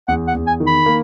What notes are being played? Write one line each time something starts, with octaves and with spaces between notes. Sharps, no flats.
E2 F#5
F#5
E2
G#5
D#3
B5
A#3